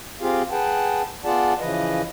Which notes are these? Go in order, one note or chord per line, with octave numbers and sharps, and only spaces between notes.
C4 F4 G4 G#4 F5
G#4 B4 F#5 G5 A5
B3 F4 G#4 D5 F#5 A5
C#3 E3 F3 B4 D#5